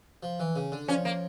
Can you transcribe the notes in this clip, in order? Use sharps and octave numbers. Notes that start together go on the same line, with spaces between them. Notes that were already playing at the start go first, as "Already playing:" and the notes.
F3
E3
C#3
D3
F3 C#4
A#3